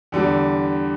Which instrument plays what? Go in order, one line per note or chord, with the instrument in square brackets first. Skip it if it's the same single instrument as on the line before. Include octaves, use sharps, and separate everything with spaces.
[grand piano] E2 D3 G3